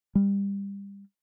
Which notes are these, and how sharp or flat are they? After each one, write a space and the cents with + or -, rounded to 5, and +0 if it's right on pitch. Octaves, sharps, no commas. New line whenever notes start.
G3 +25